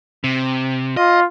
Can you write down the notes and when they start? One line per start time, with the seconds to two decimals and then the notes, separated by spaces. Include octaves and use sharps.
0.24 C3
0.97 F4 D#5